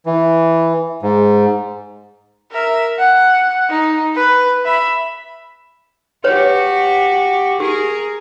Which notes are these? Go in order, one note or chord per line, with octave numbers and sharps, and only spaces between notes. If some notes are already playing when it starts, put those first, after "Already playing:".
E3
G#2
A#4 E5
F#5
D#4
B4
E5 B5
F#4 G4 B4 C#5
G4 G#4 A#4